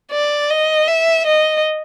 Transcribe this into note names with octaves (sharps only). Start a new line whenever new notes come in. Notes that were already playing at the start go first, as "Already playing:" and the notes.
D5
D#5
E5
D#5